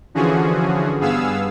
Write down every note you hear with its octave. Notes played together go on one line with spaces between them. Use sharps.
D3 E3 F3 C#4 F#4 G#4
G2 B3 G#4 F5 E6